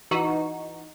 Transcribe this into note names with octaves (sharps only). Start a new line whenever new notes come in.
E3 D#4 F#4